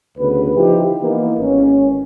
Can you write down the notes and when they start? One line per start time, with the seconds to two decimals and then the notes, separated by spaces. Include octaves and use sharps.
0.18 D2 C#3 B3 B4
0.55 F3 D#4 E4 G4
1.00 E3 A#3 B3 D#4 E4
1.40 G#1 C#4